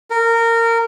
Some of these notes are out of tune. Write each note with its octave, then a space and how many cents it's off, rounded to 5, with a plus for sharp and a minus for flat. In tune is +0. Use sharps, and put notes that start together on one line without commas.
A#4 -20